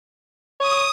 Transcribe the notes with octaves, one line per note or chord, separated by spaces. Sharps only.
C#5 D#6